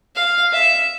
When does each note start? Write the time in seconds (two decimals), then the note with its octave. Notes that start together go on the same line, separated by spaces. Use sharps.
0.15 F5
0.53 E5